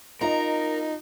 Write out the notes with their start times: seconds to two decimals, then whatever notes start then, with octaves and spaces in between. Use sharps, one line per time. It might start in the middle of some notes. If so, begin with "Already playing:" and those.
0.21 D#4 F4 A#4 D#5 A#5